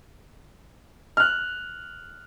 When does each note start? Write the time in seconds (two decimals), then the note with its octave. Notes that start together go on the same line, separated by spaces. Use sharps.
1.17 F6 F#6